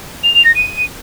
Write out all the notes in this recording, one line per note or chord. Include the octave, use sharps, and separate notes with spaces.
F7
F7
A#6
D#7